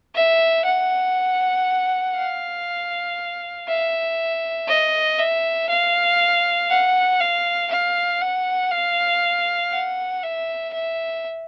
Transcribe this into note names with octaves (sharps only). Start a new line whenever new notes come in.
E5
F#5
F5
E5
D#5
E5
F5
F#5
F5
F5
F#5
F5
F#5
E5
E5